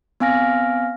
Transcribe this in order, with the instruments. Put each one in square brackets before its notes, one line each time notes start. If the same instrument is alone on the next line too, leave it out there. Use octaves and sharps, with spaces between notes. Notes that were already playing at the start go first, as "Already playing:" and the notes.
[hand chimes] B3 C4 F5 G#5 F6 A#6